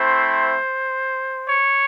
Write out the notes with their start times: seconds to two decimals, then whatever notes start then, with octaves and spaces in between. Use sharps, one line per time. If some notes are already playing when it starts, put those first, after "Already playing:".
Already playing: A3 C4 E4 C5
1.49 C#5